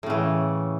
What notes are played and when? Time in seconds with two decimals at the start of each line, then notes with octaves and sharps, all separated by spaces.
0.03 A2
0.06 C#3
0.10 E3